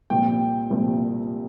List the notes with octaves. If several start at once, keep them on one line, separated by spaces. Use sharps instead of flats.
C2 A#2 F3 G5
C2 A#2 F3